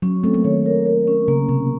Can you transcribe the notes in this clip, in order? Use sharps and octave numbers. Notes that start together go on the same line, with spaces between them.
F#3 C#4
A3 C4 A4
F#3 A#3
D#3 C#5
A#4
A#4
C#4
C#3 A#3
C3 C#4